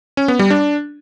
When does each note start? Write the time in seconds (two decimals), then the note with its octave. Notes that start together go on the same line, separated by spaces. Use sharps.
0.17 C#4
0.28 B3
0.39 G3
0.50 D4